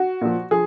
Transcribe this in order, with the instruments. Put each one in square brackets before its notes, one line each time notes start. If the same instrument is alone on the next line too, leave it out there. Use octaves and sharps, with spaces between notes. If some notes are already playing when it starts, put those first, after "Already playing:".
Already playing: [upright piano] F#4
A#2 F3
F3 G#4